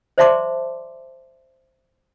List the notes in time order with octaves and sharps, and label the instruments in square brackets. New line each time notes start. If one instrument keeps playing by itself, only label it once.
[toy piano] C5 D5 E5 A5 C6 D6